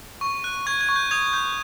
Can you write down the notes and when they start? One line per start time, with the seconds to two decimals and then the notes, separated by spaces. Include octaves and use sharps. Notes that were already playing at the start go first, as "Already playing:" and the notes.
0.21 C#6
0.44 F#6
0.66 C#6 G#6
0.81 G#6
0.89 C#6
0.96 G6
1.11 D#6 G#6
1.33 G6